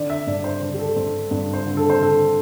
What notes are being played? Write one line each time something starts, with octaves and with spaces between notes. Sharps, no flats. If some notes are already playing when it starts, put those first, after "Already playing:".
Already playing: D3 D5
E5
G2 D5
C5
D3 C5
G4
A4
G2 C5
G2 D5
C5
D3
A4
C5
D3 A4